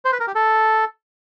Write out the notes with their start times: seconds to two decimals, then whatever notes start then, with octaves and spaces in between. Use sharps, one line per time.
0.05 C5
0.12 B4
0.20 A#4
0.27 G4
0.35 A4